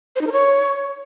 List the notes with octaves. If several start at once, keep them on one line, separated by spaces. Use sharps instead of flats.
C5
D#4
A#4
C#5